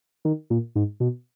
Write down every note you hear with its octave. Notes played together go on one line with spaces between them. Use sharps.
D#3
A#2
G#2
B2